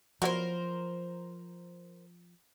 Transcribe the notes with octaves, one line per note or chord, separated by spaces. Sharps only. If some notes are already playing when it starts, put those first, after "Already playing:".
F3 F#3 B3 E4 A#4 C5